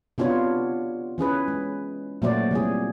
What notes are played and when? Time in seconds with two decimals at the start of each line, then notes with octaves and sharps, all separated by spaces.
0.18 C3 B3 D4 F4 F#4 C#5
1.18 E3 C#4 G#4 B4
1.48 G#3
2.22 A#2 F#3 A3 F#4 C5 D5
2.51 C3 E3 G3 G#4